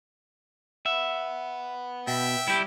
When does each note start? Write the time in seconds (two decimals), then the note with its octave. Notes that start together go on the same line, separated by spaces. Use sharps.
0.86 B4 E5 F#5
2.07 B2 E5 G5
2.48 G3 E4 G4